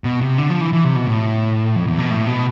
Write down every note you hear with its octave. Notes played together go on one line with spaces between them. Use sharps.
B2
C3
D3
F3
E3
E3
C3
B2
A2
F2
E2
B2
A2
B2